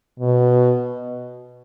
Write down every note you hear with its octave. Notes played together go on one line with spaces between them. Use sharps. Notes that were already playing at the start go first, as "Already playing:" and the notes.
B2